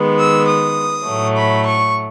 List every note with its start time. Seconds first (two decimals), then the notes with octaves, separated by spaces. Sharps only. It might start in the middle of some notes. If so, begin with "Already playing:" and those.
Already playing: D#3 G#3 B3
0.17 E6
0.47 D#6
1.06 A2 F#3 A3
1.35 B5
1.65 C#6